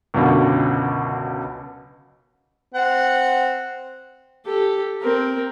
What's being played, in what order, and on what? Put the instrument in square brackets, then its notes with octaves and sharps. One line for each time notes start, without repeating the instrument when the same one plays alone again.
[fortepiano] C#2 F#2 B2 D3
[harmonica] C4 F#5
[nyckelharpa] G4 A4
C4 A#4